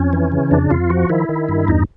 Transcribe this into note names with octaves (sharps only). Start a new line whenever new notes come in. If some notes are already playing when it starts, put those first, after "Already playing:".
Already playing: F2 C#4
E3
C#3
F2 D4
F2 F4
F3 F#4
D#3 E4
D#3
G2
E2 D#4